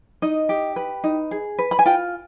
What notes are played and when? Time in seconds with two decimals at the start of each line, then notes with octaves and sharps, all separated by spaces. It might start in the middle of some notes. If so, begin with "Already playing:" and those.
0.22 D#4 D#5
0.49 G4
0.76 B4
1.04 D#4
1.31 G#4
1.59 B4
1.71 B5
1.79 G#5
1.86 F4 G5